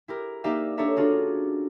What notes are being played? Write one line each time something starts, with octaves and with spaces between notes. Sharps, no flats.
E4 G4 A#4
A#3 D#4 G4 D5 E5 F5
D4 G4 A4 C#5 E5 A#5
C#4 D4 F4 F#4 G#4